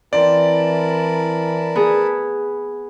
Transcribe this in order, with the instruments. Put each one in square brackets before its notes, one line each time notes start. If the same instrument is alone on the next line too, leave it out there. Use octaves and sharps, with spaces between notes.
[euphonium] E3 [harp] C4 [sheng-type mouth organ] A#4 A5 B5 [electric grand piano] D5
[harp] B3 G#4